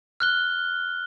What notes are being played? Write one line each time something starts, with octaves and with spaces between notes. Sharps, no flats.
F6 F#6 G7